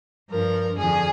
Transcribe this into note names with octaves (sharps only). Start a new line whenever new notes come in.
G2 F3 A#4
F2 D3 F3 G#4